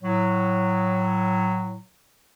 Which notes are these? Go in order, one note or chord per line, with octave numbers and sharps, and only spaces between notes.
A2 F#3